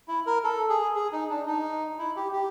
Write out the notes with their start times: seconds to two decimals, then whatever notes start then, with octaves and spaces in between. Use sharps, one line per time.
0.08 E4
0.26 A#4
0.44 A4
0.69 G#4
0.96 G#4
1.12 D#4
1.29 D4
1.47 D#4
1.99 E4
2.16 G4
2.33 G4